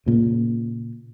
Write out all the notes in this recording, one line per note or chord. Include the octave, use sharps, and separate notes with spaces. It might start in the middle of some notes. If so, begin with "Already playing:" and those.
A#2 C#3